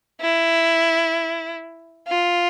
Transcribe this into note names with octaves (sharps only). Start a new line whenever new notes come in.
E4
F4